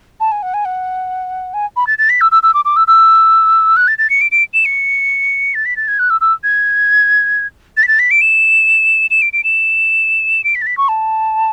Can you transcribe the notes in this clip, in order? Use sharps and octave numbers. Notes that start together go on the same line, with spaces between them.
A5
G#5
F#5
G#5
F#5
G#5
B5
A6
A6
B6
E6
E6
E6
D6
D6
E6
E6
F#6
A6
A6
C#7
D7
D7
E7
C#7
A6
B6
A6
G#6
F#6
E6
E6
G#6
A6
B6
A6
B6
D7
E7
E7
D7
D7
E7
D7
B6
A6
B6
C#6
A5